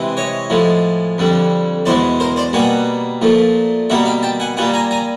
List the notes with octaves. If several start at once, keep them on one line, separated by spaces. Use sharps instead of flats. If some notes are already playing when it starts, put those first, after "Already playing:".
Already playing: C3 E3 G#3
C#5 D#5
A2 F3 G#3
F2 D3 G3
E2 B2 G#3 C5 D5
A#4 C5
C5 D5
B2 G3 A#3 F#5 G#5
A#2 F3 A3
B2 G3 A#3 E5 F#5
F5 G5
G5 A5
F#5 G#5
A#2 G3 A#3 F#5 G#5
G#5 A#5
G#5 A#5